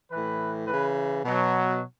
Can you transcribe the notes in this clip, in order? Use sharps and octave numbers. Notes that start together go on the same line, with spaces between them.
A2 E3 B4
C#3 E3 B4
B2 F#3